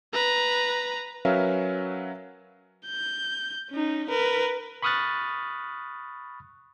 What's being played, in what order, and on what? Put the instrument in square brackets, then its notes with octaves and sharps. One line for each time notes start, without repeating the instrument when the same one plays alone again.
[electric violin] B4 A#5
[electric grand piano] F#3 C#4 A#4 B4 E5 F5
[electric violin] G6
C#4 D#4
A#4 B4
[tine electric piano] B5 C#6 D#6 F6 F#6 A6